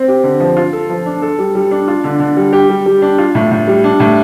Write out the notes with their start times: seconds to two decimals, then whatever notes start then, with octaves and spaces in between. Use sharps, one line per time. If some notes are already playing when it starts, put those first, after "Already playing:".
Already playing: C4
0.08 G4
0.24 D3
0.40 F3
0.57 F4
0.73 A4
0.89 F3
1.06 D4
1.22 A4
1.39 G3
1.55 G3
1.71 D4
1.88 F4
2.04 D3
2.20 D3
2.37 G3
2.53 G4
2.70 G3
2.86 G3
3.02 D4
3.18 F4
3.35 A2
3.52 A2
3.68 G3
3.84 D4
4.00 A2